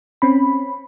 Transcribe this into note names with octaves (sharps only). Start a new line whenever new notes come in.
C4 C#4 B5